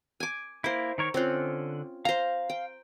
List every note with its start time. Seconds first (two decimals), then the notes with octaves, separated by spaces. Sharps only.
0.20 G#5 D6
0.64 A#3 E4 C5 D6
0.98 D#3 A#4 C#5
1.14 D3 C4 C#4 F4 F#6
2.05 C5 F5 A#5
2.50 G5